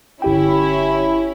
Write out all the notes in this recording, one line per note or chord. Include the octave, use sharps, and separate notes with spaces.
G1 C#4 E4 G4 G5